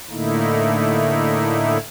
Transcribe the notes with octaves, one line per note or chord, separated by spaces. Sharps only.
A2 D3 A3 A#3 D#4 E4